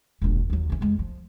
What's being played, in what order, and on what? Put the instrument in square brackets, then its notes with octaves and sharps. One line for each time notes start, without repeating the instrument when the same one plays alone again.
[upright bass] E1 A#1
D#2 F#3
C2 C#4
F2 G#3
F3